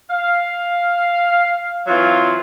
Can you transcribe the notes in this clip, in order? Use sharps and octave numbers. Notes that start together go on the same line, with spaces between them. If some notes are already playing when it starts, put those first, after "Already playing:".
F5
E3 F#3 C4 F4